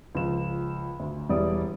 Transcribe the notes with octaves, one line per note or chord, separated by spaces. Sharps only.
C#2 F3 E7
D2
E1 G3 E4 D5 D#6